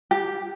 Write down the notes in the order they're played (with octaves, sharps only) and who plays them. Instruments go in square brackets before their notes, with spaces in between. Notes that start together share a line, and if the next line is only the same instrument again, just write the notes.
[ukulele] G4